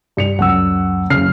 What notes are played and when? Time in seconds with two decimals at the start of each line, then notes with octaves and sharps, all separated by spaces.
0.17 G2 C#7 F7
0.39 C#2 F#2 F#5 E6
1.10 F#1 C#3 F6 C7